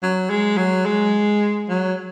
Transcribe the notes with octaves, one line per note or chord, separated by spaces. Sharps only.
F#3
G#3
F#3
G#3
F#3